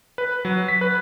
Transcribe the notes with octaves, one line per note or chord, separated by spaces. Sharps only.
B4
F#3
B6
B4